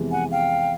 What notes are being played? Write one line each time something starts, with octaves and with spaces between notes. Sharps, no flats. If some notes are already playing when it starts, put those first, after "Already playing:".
Already playing: F2 C3 E3 G#3 B3
F#5 G#5
F5 G5